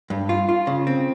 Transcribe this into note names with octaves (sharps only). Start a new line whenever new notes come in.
G2
F4
F4
C#3
C4